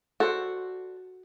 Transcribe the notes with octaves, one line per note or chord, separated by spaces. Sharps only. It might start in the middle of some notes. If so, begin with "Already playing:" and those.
F#4 A4 C5 D5